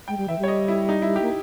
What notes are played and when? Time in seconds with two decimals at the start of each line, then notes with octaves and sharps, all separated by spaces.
0.08 G#3 G5
0.17 G3
0.28 E3 E5
0.39 G3 C#5
0.48 D#5
0.68 E4
0.89 D#4
1.02 E4
1.16 G4
1.22 A#3